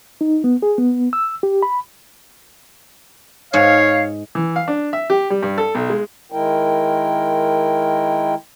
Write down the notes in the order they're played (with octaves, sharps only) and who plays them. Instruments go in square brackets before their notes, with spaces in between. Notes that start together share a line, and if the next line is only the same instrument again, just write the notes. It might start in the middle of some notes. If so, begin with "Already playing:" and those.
[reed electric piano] D#4
B3
G#4
B3
E6
G4
B5
[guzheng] G#2 G#4 [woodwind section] C#5 F5
[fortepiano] E3
F5
D4
E5
G4
G3
G2
A4
B1
G#3
[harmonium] D#3 G#3 E4 A#4 G5